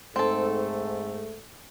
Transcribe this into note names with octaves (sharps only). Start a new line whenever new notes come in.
G#2 A3 C4 A4